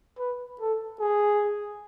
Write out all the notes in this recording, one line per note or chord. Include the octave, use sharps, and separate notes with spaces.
B4
A4
G#4